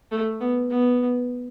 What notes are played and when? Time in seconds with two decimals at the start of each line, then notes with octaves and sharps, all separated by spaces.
0.12 A3
0.41 B3
0.70 B3